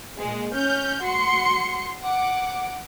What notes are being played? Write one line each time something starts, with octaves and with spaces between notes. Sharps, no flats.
A#2 G#3
C#4 F6 G6
F#4 C6 C#7
F#5 D6